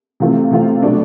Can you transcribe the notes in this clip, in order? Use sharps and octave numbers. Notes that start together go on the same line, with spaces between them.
C3 E3 A3 C4 F4
C3 E3 A3 C4 F4
B2 F#3 A3 D4